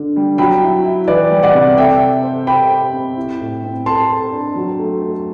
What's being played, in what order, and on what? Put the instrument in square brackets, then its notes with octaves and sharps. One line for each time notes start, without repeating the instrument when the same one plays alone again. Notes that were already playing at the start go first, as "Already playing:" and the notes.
Already playing: [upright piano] D3 D4
G3
[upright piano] F#3 [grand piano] G5 B5
[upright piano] E4
E4
[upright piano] E3 [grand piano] B4 D5
[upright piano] G3
[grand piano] D5 F#5
[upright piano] C3
[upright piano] A4 [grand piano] E5 G5
[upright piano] A4
C5
[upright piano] G4 [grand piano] G5 B5
[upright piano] C5
C4
E4
A2
C4
[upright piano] A4 [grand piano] A5 C6
[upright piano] A4
D4
F#3
A3
A3